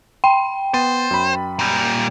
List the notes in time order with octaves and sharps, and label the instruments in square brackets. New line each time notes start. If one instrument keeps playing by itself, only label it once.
[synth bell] G5 [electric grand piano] C6
[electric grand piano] B3 A6 D#7 [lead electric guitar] C5
[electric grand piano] F#2 B5
[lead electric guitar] A#2 G3